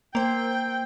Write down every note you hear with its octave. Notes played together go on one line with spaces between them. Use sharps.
A#3 C5 G5